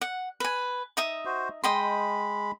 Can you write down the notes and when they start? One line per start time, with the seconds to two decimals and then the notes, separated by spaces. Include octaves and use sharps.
0.01 F#5
0.40 B4 G#5
0.97 D#4 E5 D#6
1.25 F#4 C5
1.64 G#3 D#5 G5 B5 C6